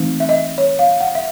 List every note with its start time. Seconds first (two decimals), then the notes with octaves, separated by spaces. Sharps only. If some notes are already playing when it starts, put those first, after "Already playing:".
Already playing: E3 A3 C4 D#4
0.20 E5
0.29 D#5
0.58 C#5
0.79 F5
1.01 F#5
1.15 E5